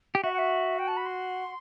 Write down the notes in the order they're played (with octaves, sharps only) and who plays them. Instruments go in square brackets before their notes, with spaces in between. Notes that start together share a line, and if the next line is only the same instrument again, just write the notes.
[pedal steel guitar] G4
[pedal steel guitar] F#4 [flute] E5
[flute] F#5
E5
G5
A5
B5
C6